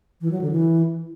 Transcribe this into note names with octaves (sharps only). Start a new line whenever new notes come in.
E3
F#3
D3
E3